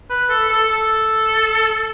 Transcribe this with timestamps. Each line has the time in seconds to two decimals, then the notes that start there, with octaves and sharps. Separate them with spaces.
0.10 B4
0.30 A4
0.49 A4
0.69 A4